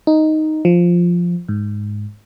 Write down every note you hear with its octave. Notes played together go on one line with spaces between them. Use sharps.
D#4
F3
G#2